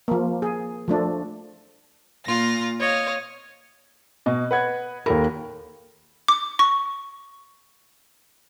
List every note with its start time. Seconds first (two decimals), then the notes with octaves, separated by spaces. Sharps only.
0.08 F3 A#3
0.42 G#4
0.88 F3 A3 D4
2.26 A#2 F4 A#6
2.80 C#5 D#5 F5
4.26 B2 D#5
4.51 B4 F#5 G#6
5.06 D#2 A4 A#4 B5
6.28 D6
6.59 C#6